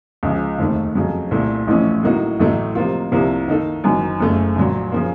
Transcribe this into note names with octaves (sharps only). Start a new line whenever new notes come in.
C#2 C#3 F3
F1 D#2 D#3 A3
F2 C#3 F#3
C2 A#2 A3
A1 A2 F3 A3 C#4
A2 F#3 A#3 D#4 F#4
A1 A2 F#3 A3
C3 F3 A#3 F4
C2 C3 F3 A#3
D#3 A#3 D#4 A4
F#1 F#2 D#3 F#3
F#1 F#2 C#3 A3
A#1 A#2 F#3
C#3 F3 A#3